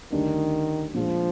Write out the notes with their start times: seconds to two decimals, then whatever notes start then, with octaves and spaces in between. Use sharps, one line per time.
0.12 D2 D3 D#3 G3 D4
0.94 A#2 F3 G#3 D4